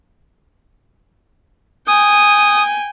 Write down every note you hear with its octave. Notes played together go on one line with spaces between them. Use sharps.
G5 G#5 D#6